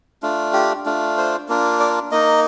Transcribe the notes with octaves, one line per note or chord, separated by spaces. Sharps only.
A3 D4 F4
G4
A3 D4 F4
C5
A#3 D4 F4
D5
A#3 D#4 D#5